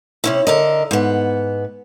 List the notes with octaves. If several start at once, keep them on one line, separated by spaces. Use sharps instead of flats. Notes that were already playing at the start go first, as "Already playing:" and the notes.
C3 C#4 E4
D3 A#4 D#5
G#2 B3